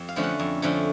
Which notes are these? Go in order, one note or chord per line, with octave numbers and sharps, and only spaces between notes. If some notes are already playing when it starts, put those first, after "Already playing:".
Already playing: F2
F5
D3 F3 A3 C#4
F#5
F2
D3 F3 A3 C#4